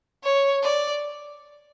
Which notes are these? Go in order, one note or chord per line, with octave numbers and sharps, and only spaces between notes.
C#5
D5